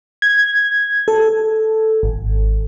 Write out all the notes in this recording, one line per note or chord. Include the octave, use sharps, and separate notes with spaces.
G#6
A4
G#1